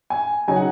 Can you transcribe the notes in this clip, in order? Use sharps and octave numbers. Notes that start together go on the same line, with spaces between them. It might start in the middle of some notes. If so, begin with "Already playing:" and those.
G#5
C#3 F#3 D#4 G#5
F#5